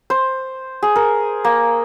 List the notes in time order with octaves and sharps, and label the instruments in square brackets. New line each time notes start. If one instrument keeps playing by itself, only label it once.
[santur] C5
G#4
A#4
A#3